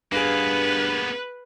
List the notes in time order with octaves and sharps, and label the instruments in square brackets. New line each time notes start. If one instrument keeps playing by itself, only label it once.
[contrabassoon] G2 [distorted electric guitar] A#3 B3 [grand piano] G#4 F5 [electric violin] B4